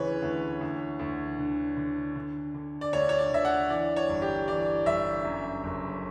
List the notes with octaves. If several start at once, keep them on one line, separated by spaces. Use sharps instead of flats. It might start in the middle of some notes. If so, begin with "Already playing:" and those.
Already playing: D2 C#3 E3 B4 C#5
D2
D2
D2
D3
D3
D3
D3
D5
D2 C#5
C#5
D5
D3 E5
F#5
E3 D5
C#5
G1
G4
E3 D5
G1 E5
F#2
F#1